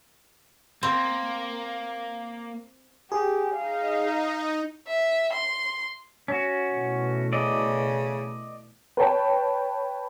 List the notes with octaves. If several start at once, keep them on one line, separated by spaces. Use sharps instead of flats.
A#3 C4
G4 G#4
D#4 F5
E5
C6
C#4 F#4
B2 E3 A3
C#3 D5 D#5
B4 C#5 G5 A5